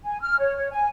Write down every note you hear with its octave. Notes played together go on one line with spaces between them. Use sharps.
G#5
F6
C#5
C#5
G#5